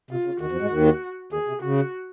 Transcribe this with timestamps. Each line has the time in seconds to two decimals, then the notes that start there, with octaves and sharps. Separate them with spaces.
0.11 C3 F4
0.25 C#3
0.41 D#2 D#3 F#4
0.52 F2 F3
0.61 G#2 G#3
0.71 D#2 D#3
1.33 D#2 D#3 G#4
1.48 C3
1.62 C#3 F#4